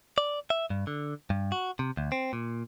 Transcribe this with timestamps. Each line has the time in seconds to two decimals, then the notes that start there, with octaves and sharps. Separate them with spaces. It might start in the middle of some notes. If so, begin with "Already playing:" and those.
0.18 D5
0.50 E5
0.70 G2
0.87 D3
1.30 G2
1.52 F#4
1.79 C3
1.97 D2
2.12 C4
2.33 A#2